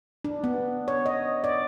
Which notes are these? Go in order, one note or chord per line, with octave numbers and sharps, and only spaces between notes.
D4
B3
C#5
D#5
D5